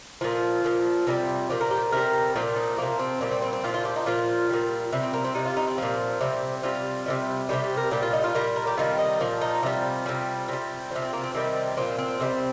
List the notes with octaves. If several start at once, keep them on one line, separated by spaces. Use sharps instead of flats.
A#2 F3 F4
A#2 F3
C3 D#3 G3
A#2 F3 G4
A#4
G4
C3 G3 A#4
A#2 F3 G4
D#4
C3 F3 A#3
C4
A#2 G3
C4
C4
C4
A#2 F3 F4
F4
G4
D#4
A#2 F3 F4
A#2 G3
C3 G3
C4
A#3
C4
C3 G3 D#4
F4
D#4
C4
A#2 F3
C3 G3
C3 G3 F4
C3 D#3 G3
C3 D#3 G3 G4
G4
A#4
A#2 G3 G4
F4
D#4
F4
A#2 G3 A#4
A#4
G4
C3 D#3 G3 F4
D#4
A#2 F3
D#4
C3 G3 F4
C3 G3
C3 G3
C3 F3
C4
A#3
C4
C3 D#3 G3 C4
A#2 F3 C4
C4
C3 D#3 G3